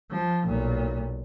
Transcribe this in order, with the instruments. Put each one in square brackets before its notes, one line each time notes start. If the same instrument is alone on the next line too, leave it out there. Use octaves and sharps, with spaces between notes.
[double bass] F3
B1 A#2